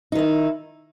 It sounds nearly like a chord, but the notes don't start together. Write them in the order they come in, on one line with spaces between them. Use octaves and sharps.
D#4 D#3 E4